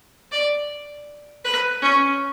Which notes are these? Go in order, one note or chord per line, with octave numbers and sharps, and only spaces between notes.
D5
B4
C#4